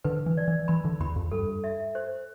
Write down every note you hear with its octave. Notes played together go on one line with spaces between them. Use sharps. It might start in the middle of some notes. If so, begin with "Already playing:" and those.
D3 B4
E3
D5
E3
E3 B5
D3
E2 B5
F2
G2 A4
E5
C5